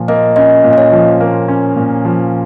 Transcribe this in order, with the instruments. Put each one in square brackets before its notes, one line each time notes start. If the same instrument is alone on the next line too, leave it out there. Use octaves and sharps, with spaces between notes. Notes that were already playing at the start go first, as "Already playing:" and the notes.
Already playing: [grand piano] A#2 F3
[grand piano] A#3 [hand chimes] D#5
[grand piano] C#4 [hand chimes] D#5
[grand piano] A#2
[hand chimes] D#5
C#5
[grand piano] F3
A#3
C#4
A#2
F3